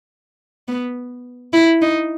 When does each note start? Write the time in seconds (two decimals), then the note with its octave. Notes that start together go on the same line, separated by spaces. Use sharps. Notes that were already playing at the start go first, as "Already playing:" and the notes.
0.68 B3
1.53 E4
1.82 D#4